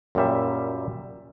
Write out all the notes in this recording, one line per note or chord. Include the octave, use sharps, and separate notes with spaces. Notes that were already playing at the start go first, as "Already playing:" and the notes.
F#2 A#2 G3 E5